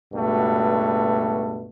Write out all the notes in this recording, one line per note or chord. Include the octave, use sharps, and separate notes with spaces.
C#2 G2 B2 A3 F#4